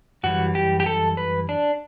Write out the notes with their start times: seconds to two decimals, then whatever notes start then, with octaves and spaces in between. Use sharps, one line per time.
0.23 F#2 E3 G3 F#4
0.55 G4
0.80 G4
0.86 A4
1.17 B4
1.49 D4